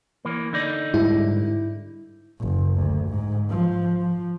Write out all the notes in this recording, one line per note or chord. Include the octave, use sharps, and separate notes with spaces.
E3 A#3
D3 D#4 D5
G#2 G3 E4
F#1
D2
G#2
F3
F3